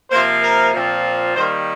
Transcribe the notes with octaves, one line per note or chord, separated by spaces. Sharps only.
C3 F3 A#3 C5
A#4
A#2 F3 C4
D#3 G3 A#3 C5